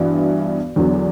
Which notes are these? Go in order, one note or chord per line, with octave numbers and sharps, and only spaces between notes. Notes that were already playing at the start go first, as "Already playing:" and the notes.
Already playing: G2 E3 B3 F#4
E2 D3 F#3 B3 F#4